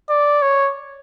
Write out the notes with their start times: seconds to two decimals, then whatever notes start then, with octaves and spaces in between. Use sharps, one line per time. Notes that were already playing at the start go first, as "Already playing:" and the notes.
0.10 D5
0.42 C#5